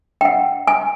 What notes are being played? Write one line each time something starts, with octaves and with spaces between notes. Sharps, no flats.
G5
F#5
G#5